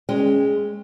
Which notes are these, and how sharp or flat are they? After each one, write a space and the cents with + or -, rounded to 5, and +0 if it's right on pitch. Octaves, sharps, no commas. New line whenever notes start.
G#3 +0 C#4 +0 G5 +25